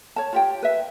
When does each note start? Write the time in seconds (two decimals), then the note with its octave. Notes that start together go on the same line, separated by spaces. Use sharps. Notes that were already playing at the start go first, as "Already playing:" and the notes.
0.16 C#5 A5
0.33 F4 G4 G5
0.62 B4 E5